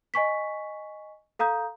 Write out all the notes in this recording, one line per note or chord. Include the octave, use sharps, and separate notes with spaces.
D#5 G#5 C#6 B6
A4 F5 A#5 D#6 G6